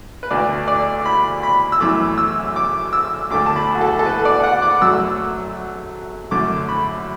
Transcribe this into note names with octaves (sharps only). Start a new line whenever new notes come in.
B4
D2 D3 A3 D5
D5
B5
B5
E6
F#2 E3 A3 D6
E6
D6
E6
D2 D3 A3 D6
A5
B5
F#4
A4
A4
B4
D5
F#5
D6
F#2 F#3 A3 E6
F#2 D3 A3 D6
B5